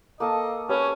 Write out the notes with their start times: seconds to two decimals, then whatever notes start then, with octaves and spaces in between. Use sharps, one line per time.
0.20 A#3 A4 D#5 A5
0.69 C#4 G4 B4 C#5